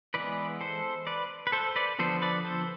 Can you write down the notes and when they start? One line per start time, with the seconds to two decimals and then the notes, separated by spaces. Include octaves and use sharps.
0.14 E3 G#3 B3 B4 D5
0.61 A4 C5
1.07 B4 D5
1.47 B4
1.52 A4 C5
1.76 B4 D5
1.99 D3 F3 B3 A4 C5
2.22 B4 D5
2.44 A4 C5